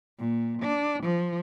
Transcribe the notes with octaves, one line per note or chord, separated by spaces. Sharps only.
A#2
D4
F3